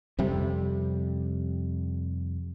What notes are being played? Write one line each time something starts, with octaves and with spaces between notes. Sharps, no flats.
F2 C3 G3